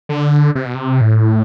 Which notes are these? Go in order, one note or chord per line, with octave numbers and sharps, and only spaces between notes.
D3
C3
B2
C3
A2